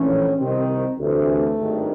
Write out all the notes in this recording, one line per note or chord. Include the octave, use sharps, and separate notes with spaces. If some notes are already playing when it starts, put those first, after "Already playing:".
Already playing: A#1 A2 E3 C#4
C2 C3 D#3 C4
D2 C3 E3
A3
G#1 G2 D#3